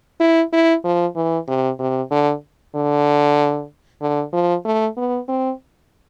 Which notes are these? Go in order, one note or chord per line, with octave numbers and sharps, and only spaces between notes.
E4
E4
F3
E3
C3
C3
D3
D3
D3
F3
A3
B3
C4